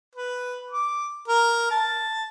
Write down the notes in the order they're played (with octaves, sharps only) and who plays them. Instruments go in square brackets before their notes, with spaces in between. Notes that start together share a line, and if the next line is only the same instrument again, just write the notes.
[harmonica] B4
D6
A#4
A5